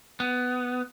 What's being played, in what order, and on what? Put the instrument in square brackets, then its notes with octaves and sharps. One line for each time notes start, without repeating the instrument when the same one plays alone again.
[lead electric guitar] B3